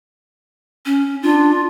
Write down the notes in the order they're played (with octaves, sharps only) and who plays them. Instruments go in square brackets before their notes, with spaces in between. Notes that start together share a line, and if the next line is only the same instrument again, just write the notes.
[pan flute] C#4
[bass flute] D4 [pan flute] F4